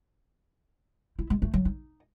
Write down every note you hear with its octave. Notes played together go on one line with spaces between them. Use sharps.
E4
G#3
A3
F#3
D#4